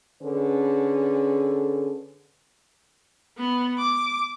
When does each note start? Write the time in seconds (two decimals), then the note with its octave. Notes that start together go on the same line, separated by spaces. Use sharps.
0.22 D3 C#4 G#4 A4 B4
3.38 B3
3.78 D6